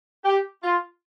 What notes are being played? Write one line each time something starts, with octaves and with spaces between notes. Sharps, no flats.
G4
F4